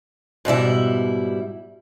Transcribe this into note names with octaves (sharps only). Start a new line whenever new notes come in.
G#2 B2 G3 E4